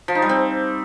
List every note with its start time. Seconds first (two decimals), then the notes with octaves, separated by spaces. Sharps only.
0.08 F3
0.15 D#4
0.22 G3
0.29 C4